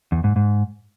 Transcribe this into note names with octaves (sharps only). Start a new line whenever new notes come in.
E2
G#2
G#2